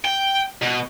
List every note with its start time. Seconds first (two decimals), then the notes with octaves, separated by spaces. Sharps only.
0.05 G5
0.62 B2